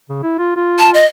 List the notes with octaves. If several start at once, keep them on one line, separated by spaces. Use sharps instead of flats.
C#3
E4
F4
F4
A5
D#5